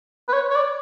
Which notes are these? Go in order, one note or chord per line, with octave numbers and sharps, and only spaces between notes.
B4
C#5
C#5
D5